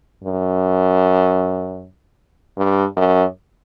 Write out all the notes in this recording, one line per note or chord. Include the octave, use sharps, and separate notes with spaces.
F#2
G2
F#2